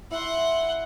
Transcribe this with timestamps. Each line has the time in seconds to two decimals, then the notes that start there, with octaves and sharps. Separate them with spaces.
0.11 E4 F#5 C6